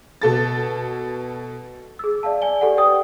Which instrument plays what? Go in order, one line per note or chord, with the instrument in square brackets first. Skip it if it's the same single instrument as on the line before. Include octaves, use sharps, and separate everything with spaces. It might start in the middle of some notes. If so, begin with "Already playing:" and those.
[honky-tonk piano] B2 A4 A6
[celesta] G#4 E6
D5 E5 F5 A5
D5 G#5 G7
G4 A4 D5 F#5
G4 B4 D5 G5 D#6